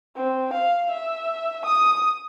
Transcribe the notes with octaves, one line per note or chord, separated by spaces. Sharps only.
C4
F5
E5
D#6